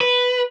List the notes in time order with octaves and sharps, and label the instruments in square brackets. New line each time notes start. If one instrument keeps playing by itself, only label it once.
[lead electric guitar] B4